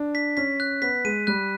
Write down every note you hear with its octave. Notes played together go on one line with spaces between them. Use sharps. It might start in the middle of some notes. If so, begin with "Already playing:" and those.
Already playing: D4
B6
C#4 B6
F#6
B3 B6
G#3 D#7
G3 F#6